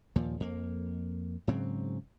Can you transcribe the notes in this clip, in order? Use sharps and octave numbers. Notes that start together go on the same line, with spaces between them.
D#2 A#2 F3
F2 A#3
G#2 C#3 F#3 C4